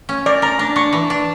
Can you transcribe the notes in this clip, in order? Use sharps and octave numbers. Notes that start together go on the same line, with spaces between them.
C#4
A#4 D5
A#4 A#5
D4 A#5
D4 C#6
E3
D4